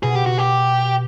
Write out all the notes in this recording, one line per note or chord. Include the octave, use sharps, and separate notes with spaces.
B2 G#4
G4
F#4
G4